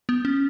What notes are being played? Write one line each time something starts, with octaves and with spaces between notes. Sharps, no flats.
B3
C#4